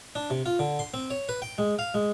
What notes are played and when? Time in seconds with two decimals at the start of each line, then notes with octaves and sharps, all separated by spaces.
0.15 D4
0.30 C3
0.46 F4
0.59 D3
0.79 C6
0.94 C4
1.10 C#5
1.29 B4
1.42 G5
1.58 G#3
1.79 F5
1.94 G#3